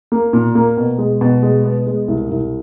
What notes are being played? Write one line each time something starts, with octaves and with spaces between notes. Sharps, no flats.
A#3
A#2
A#3
B2
G#3
B2
G#3
B3
G#3
C2
C2